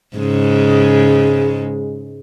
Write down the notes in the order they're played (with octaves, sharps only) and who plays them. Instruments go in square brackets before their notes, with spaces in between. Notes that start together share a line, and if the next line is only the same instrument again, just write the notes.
[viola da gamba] G#2 C#3 G#3